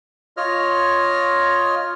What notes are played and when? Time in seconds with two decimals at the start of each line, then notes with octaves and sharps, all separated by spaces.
0.37 F4 C#5 D#5 F6